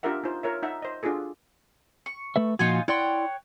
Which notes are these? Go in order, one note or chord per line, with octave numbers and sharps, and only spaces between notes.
D4 F4 G4 A#4 E5 F#5
D#4 F4 C5
F4 A#4 C#5 E5
D#4 E5 F#5 A5
C5 D#5
D4 F4 F#4 G#4 A4
C#6
A3 B4 E5
A#2 F3 D#4 F4 F#4 G#5
E4 C#5 D5 F#5 G5 C6